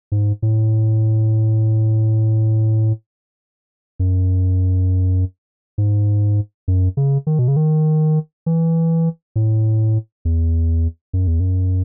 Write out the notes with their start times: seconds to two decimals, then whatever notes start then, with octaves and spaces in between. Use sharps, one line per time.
0.12 G#2
0.42 A2
4.00 F#2
5.78 G#2
6.68 F#2
6.97 C#3
7.27 D#3
7.39 B2
7.48 C#3
7.56 D#3
8.46 E3
9.36 A2
10.25 E2
11.13 F#2
11.27 E2
11.40 F#2